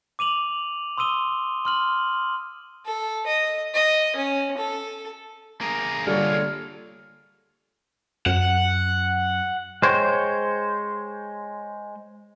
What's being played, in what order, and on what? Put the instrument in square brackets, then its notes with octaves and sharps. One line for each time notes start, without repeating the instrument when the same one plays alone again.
[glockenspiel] D6 D#7 F7 F#7
C6 D#6 E6 D#7 G7
C6 F6 F#7
[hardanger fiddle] A4
D#5
D#5
C#4
A4
[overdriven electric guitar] A#3 G#4 [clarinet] A#5
[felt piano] D3 G3 [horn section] F4 A4 C#5 [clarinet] F6
[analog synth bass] F#2 [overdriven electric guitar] F#5
[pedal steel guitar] G#3 C5 C#5 G5